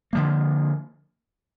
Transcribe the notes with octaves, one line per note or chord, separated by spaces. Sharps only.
D3 F3 A#3